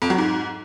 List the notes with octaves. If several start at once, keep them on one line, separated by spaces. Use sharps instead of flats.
F2
F#3
G#2